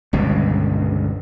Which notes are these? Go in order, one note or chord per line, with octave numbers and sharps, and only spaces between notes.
G1 C#2 G2 B2